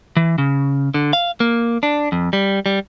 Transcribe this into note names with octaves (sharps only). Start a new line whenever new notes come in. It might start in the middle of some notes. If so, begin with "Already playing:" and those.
E3
C#3
D3
F5
A#3
D4
F2
G3
G3